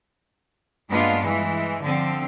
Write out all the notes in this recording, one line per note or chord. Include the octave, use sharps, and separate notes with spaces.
G2 G#3 A#3 B3 D4 F4
E3 G#3
D3 F3 C4